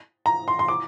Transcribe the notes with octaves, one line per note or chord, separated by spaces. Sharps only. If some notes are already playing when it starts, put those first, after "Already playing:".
A#5
C6
C6
D6